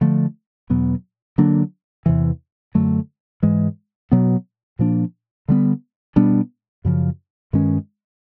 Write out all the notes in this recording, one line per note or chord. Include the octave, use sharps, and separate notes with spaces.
D3 F3 A3
E2 B2 F#3 B3
D3 F#3 A#3 D4
E2 C3 E3
F#2 D3 F#3 A3
G#2 E3 G#3
B2 F#3 B3
A#2 F3 A#3 D4
D3 G3 B3
B2 G3 B3 D4
F#2 C#3 F3
G2 D#3 G#3 C#4